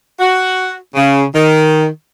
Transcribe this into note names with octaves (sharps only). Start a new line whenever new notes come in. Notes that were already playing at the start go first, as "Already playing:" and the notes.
F#4
C#3
D#3